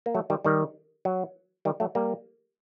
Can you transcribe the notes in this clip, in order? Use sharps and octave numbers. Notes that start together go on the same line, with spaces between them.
A#3
F#3 A3
D#3 G3
D#3 G3
F#3
D#3 G3
F#3 A3
G3 A#3